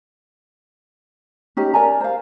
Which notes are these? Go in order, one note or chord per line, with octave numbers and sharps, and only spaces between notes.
C#4 D#4 G4
A#4 D5 G#5 A#5
C5 F5